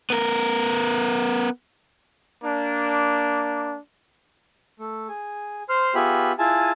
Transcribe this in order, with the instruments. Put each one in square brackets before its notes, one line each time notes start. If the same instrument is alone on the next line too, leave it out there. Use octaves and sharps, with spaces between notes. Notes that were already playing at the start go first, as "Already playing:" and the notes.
[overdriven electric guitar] B3 A#4
[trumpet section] A#3 D4
[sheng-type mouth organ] A3
G#4
C5 C6 F6
B3 F4 G4 G#4 E5 B5
E4 F4 G#4 G#5 A5